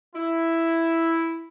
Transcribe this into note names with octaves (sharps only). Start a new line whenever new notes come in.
E4